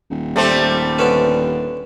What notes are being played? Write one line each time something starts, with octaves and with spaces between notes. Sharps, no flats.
D#1
G3 A3 C4
D3 B3 C#4